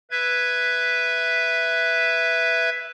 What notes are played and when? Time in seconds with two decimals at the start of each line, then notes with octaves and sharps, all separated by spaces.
0.11 B4 E5 G#6